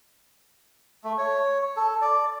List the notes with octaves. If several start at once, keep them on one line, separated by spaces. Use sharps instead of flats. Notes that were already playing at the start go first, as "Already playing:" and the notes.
A3
C#5
A4
D5